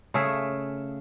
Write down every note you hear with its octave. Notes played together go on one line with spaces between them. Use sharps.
C#3 A3 G#4 E5